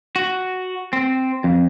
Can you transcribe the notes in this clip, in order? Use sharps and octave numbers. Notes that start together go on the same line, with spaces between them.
F#4
C4
F2